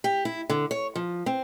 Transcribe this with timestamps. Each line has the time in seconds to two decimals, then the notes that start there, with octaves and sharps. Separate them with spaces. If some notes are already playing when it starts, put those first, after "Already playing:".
0.04 G4
0.25 E4
0.50 D3
0.71 C#5
0.96 F3
1.26 C4